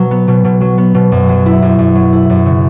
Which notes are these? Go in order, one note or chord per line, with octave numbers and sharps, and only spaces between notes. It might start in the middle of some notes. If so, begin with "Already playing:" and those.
Already playing: B2 F#3
B3
B2
B2
F#3
B3
B2
F#2
F#3
E4
F#2
F#2
F#3
E4
F#2
C#3